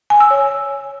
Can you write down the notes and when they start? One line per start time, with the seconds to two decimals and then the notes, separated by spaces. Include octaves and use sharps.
0.10 G#5
0.20 E6
0.31 C#5